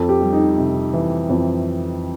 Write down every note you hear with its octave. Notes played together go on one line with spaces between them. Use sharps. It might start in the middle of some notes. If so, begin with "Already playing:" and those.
Already playing: F2 A4
G4
G3
D#4
C3
E3
F2